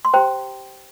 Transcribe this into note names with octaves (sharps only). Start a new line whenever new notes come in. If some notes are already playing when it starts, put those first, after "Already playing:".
C6
G4 C5 G5 A#5